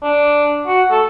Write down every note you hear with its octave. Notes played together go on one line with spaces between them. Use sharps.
D4
F#4
A4